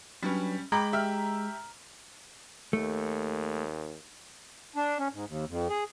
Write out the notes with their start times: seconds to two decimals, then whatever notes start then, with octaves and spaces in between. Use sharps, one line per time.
0.23 F#3 G3 C#4 D4 B4
0.72 G#3 G5 A#5 B5 D6
0.93 G4 E5 F6
2.73 D#2 A3
4.76 D4
4.99 C#4
5.13 G#2
5.28 D#2
5.48 F2
5.69 G#4